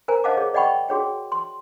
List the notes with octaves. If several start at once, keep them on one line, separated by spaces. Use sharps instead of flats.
A#4 C5 G#5 A#5
C5 D#5 F5 F#5 A5 D6
G#4 C#5
D5 D#5 F#5 G5 B5 C#6
F#4 G#4 C#5 G5
C6